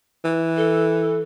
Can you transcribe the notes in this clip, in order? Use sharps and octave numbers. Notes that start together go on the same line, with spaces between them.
E3
A4